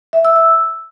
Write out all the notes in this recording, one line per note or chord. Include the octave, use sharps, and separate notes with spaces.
E5
E6
E6